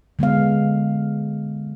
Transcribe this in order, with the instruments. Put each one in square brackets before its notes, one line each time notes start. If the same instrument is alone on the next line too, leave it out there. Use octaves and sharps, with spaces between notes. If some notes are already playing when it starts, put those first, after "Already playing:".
[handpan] D3 G#3 B3 F5